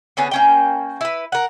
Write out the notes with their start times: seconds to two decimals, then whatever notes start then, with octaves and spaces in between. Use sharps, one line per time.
0.17 D3 B3 C#4 G#4
0.31 A#3 C#4 G5
1.01 E4 B4
1.32 A#4 F#5